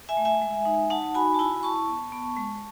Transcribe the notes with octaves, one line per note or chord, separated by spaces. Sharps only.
E5 G#5
A3
E5 G#5
G#3
D#4
D#4 F#5 A5
F#4 G#5 B5
A5
E4 G#5 B5
E4 A5 C#6
B3
B3
G#3